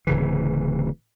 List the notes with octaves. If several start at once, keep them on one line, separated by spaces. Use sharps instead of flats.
D1 C#3 E3